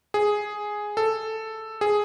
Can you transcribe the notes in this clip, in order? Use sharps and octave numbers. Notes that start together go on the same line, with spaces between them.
G#4
A4
G#4